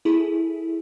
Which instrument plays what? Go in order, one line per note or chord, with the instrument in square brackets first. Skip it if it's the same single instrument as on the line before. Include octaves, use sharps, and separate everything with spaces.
[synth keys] E4 G#4 A4